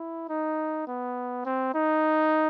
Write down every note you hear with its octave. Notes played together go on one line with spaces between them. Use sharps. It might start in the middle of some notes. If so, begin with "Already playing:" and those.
Already playing: E4
D#4
B3
C4
D#4